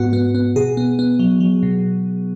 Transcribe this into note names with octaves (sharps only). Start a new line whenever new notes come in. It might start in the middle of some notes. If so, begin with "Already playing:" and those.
Already playing: G#2 B3 F#4
B3
B3
B2 G#4
B3
B3
F#3
F#3
B2